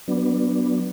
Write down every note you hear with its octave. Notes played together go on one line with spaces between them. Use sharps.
F#3 B3 D4